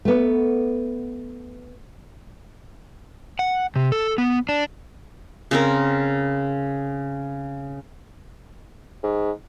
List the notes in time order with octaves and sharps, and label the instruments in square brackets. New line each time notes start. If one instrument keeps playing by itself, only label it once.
[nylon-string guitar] A3 B3
[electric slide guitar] F#5
C3
A4
B3
D4
[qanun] C#3 C4 A#4
[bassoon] G#2